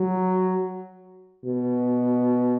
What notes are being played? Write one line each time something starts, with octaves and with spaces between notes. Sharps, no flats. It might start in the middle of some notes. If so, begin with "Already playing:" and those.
Already playing: F#3
B2